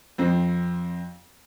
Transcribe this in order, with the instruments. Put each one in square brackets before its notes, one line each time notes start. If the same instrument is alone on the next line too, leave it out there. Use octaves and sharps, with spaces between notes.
[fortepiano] F2 C4